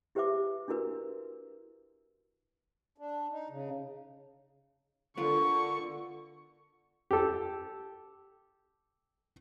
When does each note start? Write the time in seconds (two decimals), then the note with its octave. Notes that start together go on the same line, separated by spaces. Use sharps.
0.15 E4 G4 B4 C5 E5 D6
0.68 D4 E4 F#4 A#4 B4
2.98 D4
3.30 D#4
3.50 C#3
5.17 D3 B3 F4 A#4 C#6
7.11 G4 A4